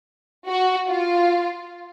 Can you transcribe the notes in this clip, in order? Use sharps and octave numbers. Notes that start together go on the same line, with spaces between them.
F#4
F4